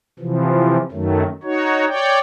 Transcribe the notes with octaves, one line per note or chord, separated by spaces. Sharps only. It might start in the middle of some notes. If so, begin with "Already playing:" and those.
C3 E3 F3
F#2 D#3 F#3 A3
D#4 F#4 C#5
C#5 D5 G5